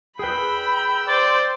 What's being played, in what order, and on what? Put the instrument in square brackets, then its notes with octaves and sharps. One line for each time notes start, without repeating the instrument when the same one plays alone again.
[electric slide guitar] G#4 B4 [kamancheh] G5 E6 [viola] B5
[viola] C5 [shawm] D5